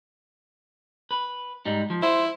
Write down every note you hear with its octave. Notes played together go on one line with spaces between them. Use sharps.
B4
G#2 G3 D#4
F3
E4 C5